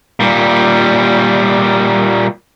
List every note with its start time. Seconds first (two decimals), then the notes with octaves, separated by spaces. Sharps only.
0.20 A#2 G3